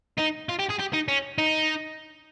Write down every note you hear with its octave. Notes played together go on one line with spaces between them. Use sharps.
D#4
F4
G4
G#4
G4
D#4
C#4
D#4